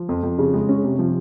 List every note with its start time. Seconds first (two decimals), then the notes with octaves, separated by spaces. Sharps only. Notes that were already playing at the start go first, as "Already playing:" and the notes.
Already playing: F3
0.09 F2
0.23 F2
0.39 C#3
0.54 G#3
0.69 C#4
0.84 C3
0.99 F3